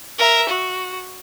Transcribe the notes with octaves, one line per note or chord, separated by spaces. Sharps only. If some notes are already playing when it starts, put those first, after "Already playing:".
A#4 E5
F#4